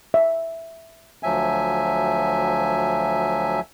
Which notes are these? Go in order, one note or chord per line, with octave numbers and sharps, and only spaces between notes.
E5
D2 F3 F#3 E5 G#5